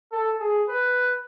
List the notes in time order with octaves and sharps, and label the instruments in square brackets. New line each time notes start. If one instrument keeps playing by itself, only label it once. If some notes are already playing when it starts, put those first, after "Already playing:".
[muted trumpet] A4
G#4
B4